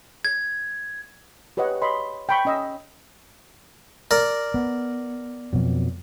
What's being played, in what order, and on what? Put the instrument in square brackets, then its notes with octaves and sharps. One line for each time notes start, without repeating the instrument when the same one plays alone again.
[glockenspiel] G#6
[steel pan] G4 B4 C#5 D#5 F#5
C#5 D#5 B5 C6
G5 B5 C#6
C#4 D#5 E6
[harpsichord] A#4 D5
[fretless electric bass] B3
F2 B2 F#3